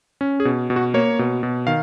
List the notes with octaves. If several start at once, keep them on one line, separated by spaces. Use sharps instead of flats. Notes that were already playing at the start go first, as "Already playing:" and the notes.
C#4
G#4
B2
B2
F#4
A#3 C#5
B2
B2
D#3 F5